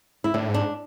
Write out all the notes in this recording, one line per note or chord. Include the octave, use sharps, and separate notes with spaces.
E4
A2 D4
G#2
D4